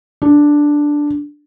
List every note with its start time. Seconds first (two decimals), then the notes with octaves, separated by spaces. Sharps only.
0.22 D4